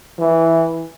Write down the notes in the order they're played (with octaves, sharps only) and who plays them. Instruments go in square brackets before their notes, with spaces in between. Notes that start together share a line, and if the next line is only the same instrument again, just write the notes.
[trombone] E3